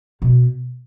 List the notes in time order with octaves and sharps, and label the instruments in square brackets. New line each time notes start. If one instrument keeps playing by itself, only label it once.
[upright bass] B2